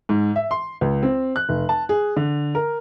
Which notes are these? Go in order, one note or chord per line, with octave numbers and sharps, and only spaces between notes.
G#2
E5
C6
C#2
C4
F#6
F1
A5
G#4
D3
A#4